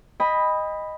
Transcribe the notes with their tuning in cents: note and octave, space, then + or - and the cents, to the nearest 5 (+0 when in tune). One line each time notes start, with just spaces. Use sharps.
D#5 +0 G5 +40 B5 +0